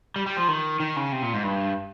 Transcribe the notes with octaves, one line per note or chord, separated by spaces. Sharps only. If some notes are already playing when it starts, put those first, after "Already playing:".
G3
G3
F3
D#3
D#3
C#3
C3
A#2
G#2
G2